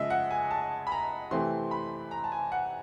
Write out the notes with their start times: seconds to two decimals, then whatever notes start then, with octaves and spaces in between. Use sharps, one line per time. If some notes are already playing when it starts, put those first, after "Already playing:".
Already playing: C#3 F3 G#3 D#5 E5
0.10 F#5
0.31 G#5
0.51 A5
0.87 B5
0.92 A#5
1.31 C3 E3 A3 C4 C6
1.71 B5
2.11 A#5
2.24 A5
2.32 G#5
2.52 F#5